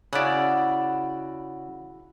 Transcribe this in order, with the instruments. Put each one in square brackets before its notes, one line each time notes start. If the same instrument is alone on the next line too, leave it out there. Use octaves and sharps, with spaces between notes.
[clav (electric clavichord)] C#3 D5 [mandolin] E4 F#4